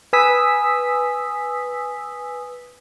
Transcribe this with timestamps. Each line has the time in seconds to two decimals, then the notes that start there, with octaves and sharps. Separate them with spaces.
0.13 B4 G#5 D#6 E6 B6